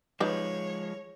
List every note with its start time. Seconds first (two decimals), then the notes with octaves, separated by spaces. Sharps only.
0.20 F3 G#3 D#4 B4 C#5 D5